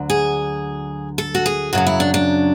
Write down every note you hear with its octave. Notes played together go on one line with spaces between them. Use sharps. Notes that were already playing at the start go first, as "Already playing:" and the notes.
Already playing: D2 D3 F#3
G#4
A4
F#4
G#4
F#2 C#3 F#3 F#4
E4
D4
D4